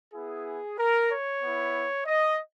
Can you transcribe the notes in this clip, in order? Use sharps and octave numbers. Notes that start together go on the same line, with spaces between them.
B3 E4 G#4
A#4
C#5
B3 E4
D#5